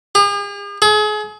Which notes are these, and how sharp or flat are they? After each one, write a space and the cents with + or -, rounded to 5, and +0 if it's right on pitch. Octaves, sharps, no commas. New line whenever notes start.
G#4 -45
G#4 +35